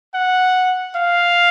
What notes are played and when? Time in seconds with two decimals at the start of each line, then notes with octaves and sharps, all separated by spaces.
0.14 F#5
0.96 F5